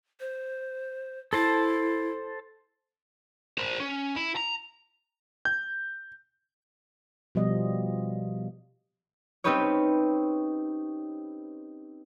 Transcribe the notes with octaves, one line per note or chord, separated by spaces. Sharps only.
C5
E4 A4 C5 A5
A#4 C5
C#4
E4
A#5
G6
B2 F3 G3 D#5
C4 C#4 D#4 G4 B4 C#5